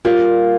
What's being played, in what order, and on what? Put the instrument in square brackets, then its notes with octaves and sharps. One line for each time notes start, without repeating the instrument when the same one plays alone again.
[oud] G3 A#3 [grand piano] F4